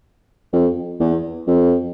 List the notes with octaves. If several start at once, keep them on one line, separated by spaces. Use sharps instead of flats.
F2
E2
F2